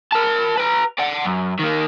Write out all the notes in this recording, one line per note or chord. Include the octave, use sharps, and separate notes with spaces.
A#4 A5
B4 A#5
D5 F#5
F#2
D#3 A#3